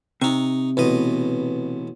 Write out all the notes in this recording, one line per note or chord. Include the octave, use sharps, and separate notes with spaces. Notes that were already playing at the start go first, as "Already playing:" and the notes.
C3 D#4 C#6
A1 B2 D#5